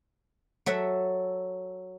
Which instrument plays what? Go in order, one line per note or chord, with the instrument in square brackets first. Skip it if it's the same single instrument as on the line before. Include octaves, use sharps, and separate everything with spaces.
[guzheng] F#3 A4 E5 F#5